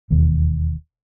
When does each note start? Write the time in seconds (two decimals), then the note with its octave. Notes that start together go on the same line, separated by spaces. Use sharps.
0.11 E1 D#2